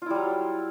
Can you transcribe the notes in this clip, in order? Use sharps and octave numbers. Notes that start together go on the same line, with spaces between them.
F#3 G3 E4 F4